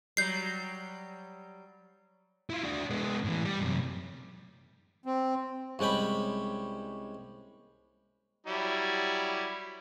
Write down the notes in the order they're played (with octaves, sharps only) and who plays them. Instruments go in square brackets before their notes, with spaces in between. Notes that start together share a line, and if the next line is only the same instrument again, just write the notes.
[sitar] F#3 G3 [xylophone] G6 C7
[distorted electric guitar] E4 F4
D4 F#4
G#3 B3
A2 E3
G3
F#2 C3
[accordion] C4
[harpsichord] C2 G#3 C#4 G5 B5
[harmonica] F#3 G3 E4